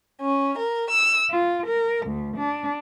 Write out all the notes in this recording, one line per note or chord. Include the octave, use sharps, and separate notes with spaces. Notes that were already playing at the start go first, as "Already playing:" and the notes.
C#4
A#4
E6
F4
A#4
D2
D4